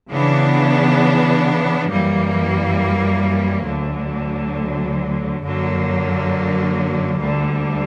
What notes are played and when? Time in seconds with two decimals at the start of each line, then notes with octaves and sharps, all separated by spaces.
0.11 C#3 E3 B3 D4
1.89 F#2 E3 G3 A#3
3.65 D2 D3 F#3
5.42 F#2 D3 F#3 A#3
7.19 D2 D3 G3